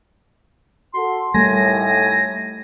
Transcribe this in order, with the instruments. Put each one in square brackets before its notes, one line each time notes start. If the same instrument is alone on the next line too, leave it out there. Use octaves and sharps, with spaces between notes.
[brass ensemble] F#4 A4 [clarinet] C6
[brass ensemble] D#2 A2 [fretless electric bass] G3 A3 [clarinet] G#5 [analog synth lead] A#6